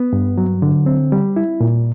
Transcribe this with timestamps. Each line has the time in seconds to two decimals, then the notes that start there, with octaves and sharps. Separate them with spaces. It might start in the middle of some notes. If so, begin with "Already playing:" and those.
Already playing: B3
0.13 G2
0.37 F#3
0.62 D3
0.86 C4
1.12 G3
1.36 E4
1.60 A#2